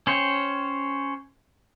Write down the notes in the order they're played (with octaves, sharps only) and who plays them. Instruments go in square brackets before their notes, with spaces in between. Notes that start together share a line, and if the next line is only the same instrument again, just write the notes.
[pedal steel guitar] C#4 C5 C#5 G5